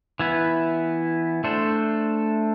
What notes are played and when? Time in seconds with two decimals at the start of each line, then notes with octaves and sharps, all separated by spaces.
0.20 E3 B3 E4 B4
1.44 A3 D4 A4 C5